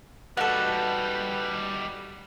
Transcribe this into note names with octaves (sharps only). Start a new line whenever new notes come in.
G3 D#4 F#4 A4 B4